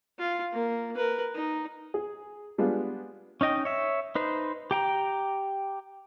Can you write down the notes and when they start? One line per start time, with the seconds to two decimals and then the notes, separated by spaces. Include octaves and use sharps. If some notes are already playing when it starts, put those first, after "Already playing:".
0.19 F4
0.53 A#3
0.95 A#4 B4
1.34 D#4
1.94 G#4
2.58 G3 G#3 B3 D4 F4
3.41 C#4 D#4 D#5 G5
3.65 C#5 E5
4.15 D#4 B4 C5
4.71 G4 G5 A#5